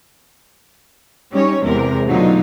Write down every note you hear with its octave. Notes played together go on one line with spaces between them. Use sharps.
G3 C#4 D#4 C#5
E2 C3 G#3 A#4
B2 D3 F#3 A3 D#4 F4